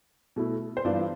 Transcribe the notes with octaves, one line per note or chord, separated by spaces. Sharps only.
B2 A3 E4
C5
G2 E3 B3 F4 D5